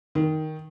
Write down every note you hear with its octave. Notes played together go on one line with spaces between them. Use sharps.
D#3